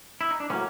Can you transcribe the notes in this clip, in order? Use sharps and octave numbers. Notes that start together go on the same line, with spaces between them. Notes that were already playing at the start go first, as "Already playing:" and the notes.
E4
D#4
D4
A2 F#3 A#3 B3 C#4